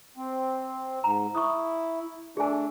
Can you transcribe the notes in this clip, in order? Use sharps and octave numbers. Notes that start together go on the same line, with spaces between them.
C4
G#2 A#5
E4 C#6 D#6
A3 D4 G#4 G#5